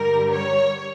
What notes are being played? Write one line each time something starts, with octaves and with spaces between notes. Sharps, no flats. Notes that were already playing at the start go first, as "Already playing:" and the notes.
Already playing: G2 D3 G3 A#4
C#5